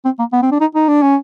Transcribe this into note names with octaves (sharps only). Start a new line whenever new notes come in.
C4
A#3
B3
C4
D4
D#4
D#4
D4
C#4